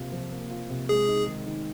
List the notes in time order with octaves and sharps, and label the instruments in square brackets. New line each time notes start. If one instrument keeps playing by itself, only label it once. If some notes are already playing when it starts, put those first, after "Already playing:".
Already playing: [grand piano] C3 F3 A#3 F4
F3
A#3
F4
C3
[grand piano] G#3 [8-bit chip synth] G#4
[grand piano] D#4
D#3
D#3